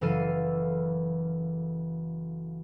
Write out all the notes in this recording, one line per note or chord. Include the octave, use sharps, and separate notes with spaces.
F#1 E3 A4 F5 F6 D#7